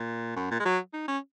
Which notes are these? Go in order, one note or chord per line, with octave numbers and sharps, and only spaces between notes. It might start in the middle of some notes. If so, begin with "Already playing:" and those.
Already playing: A#2
F#2
A#2
G#3
F#3
D#4
C#4